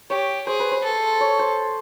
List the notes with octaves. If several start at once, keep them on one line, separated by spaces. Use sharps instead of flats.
G4 C#5
G#4 C5
B4
C5
A4
C#5
C5